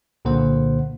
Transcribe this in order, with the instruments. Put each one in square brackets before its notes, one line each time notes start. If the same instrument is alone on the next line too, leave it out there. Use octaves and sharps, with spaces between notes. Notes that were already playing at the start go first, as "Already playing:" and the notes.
[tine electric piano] C2 A#2 D3 A#3 C5 F#5